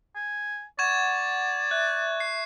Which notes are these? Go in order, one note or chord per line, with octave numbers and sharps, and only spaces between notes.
G#5
D5 F#5 C#6 G#6 E7
E5 F#6
C7